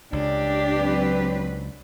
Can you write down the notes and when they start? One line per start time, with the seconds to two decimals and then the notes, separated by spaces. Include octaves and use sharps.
0.13 C#2 D4 G4
0.76 F#3 C4 B4